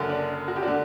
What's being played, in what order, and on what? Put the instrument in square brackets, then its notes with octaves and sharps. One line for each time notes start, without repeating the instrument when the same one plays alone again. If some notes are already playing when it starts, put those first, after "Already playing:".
Already playing: [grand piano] F#1 F#2 D3
D4
F#4
G4
D3 D4 F#4